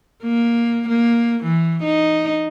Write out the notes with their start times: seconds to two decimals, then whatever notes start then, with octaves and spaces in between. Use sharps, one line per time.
0.23 A#3
0.88 A#3
1.44 E3
1.83 D#4